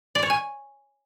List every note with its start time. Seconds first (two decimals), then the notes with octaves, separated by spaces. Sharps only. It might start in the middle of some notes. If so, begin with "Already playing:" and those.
0.15 D5
0.23 C#5
0.30 G#5